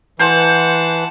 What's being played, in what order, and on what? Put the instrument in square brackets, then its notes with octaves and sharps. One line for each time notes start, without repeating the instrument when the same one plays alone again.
[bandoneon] E3 [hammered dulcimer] C5 [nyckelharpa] F#5 A5